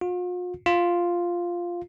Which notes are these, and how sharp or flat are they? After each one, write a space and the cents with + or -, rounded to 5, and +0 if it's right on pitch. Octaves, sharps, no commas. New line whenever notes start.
F4 +45
F4 +0